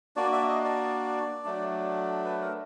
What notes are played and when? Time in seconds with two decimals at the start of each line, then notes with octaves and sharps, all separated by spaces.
0.16 A#3 D4 F#4 D5
0.32 E5
0.48 D#5
0.64 D5
1.44 F#3 A3 D4
2.25 B4
2.42 A#4